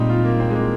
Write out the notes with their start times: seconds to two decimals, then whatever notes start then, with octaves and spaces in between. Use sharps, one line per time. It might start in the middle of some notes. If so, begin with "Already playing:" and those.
Already playing: A#2 G3 G#3 C4 D#4
0.10 F4
0.25 A#3
0.40 C4
0.50 G#3
0.55 A#3